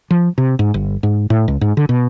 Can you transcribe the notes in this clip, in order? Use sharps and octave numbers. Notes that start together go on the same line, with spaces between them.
F3
C3
G#2
G1
G#2
A2
C#2
G#2
D3
B2